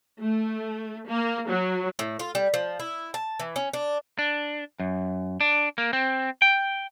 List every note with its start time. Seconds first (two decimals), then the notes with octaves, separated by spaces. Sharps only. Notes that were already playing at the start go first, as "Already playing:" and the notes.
0.20 A3
1.06 A#3
1.47 F#3
1.99 A2
2.19 F4
2.35 G3
2.54 F3
2.80 E4
3.14 A5
3.40 E3
3.56 C#4
3.73 D4
4.19 D4
4.80 F#2
5.41 D4
5.78 A#3
5.93 C4
6.42 G5